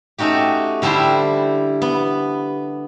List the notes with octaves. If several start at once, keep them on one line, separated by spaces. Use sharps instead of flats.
A3 C#4 D#4 F#4 G4
D3 G3 D4 E4 C5
B3